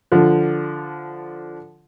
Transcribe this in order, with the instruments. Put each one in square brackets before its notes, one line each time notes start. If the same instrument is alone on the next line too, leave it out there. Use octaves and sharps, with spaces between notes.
[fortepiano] D3 F3